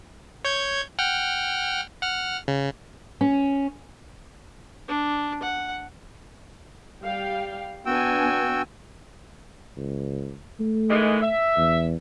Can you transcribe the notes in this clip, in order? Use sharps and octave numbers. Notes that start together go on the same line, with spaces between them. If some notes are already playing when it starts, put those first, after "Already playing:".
C#5 G6 G#6
F#5 G5 F6
F#5 F6
C#3
C#4
D4
F#5
G3 F5 G5
B3 D4 F#4 G5 G#5 E6
C#2
A3
D#3 E3 G#3
E5
E2